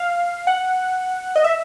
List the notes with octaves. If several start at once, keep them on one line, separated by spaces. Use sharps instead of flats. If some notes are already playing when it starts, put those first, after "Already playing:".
Already playing: F5
F#5
D#5
E5